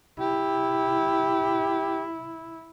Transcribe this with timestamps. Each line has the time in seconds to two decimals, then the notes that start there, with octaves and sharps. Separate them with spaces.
0.19 E4 G4